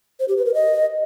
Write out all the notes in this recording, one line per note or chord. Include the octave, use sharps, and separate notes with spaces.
C5
G4
B4
A#4
D#5